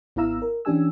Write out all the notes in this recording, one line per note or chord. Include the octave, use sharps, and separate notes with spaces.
G#1 B3 E4 F5 A#5 E6
A#4
E3 C#4 D4 G4 G#5 E6